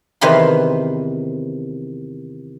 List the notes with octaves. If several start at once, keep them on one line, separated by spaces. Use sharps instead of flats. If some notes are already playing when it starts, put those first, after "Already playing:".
E2 C3 D#3 B4 F5 C6